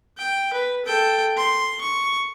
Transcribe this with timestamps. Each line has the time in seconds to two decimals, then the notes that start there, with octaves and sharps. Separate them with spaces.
0.18 G5
0.53 B4
0.86 A4 G5
1.37 C6
1.81 C#6